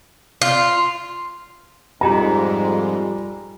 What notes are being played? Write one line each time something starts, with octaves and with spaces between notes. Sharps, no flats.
F4
F2 G#2 G3 G#3 F4 G4 G#5 A#5